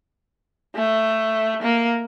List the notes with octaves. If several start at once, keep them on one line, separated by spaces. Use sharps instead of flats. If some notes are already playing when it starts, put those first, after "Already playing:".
A3
A#3